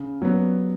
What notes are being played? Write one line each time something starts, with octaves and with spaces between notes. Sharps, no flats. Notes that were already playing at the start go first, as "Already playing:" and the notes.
Already playing: C#3
F#3 B3